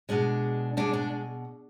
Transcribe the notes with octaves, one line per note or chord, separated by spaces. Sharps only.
B2 G#3 D4
B2 G#3 D4
D4